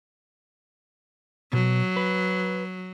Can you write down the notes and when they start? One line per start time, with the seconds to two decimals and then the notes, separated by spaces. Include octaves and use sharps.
1.53 B2 F#3
1.97 B4